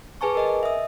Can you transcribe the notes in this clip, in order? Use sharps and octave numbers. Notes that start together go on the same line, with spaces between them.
G#4 B4 G#5 A5 C#6
A#4 D#5 G#5
D#5
E5 D#6